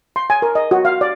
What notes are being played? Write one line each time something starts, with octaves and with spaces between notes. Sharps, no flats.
C6
G#5
A#4
D#5
F#4
F5
D5